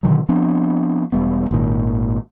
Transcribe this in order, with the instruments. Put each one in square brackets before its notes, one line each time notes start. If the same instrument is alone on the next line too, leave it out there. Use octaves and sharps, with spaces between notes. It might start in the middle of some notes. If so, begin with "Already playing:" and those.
[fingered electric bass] B2 D3 D#3 F#3
F3 B3 C4 D4
E1 G3 B3
G#1 A#2 D#3